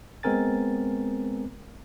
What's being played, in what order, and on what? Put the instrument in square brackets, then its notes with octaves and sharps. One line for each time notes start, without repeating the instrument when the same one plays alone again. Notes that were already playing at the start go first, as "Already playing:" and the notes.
[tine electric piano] G#3 B3 C4 A#4 G#5 A6